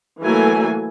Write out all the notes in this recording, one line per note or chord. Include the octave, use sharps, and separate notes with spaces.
E3 F#3 A3 A#3 G#5